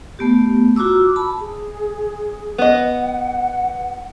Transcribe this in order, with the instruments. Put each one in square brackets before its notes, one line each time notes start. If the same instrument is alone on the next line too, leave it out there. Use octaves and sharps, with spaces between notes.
[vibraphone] A3 B3 G4
F4 F#4 A#5 D6 E6
A5 B5
[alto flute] G#4
[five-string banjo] B3 D#5 [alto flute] F#5